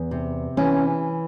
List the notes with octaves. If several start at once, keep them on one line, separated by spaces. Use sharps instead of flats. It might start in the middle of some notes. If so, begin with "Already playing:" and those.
Already playing: E2
C3
E3 C#4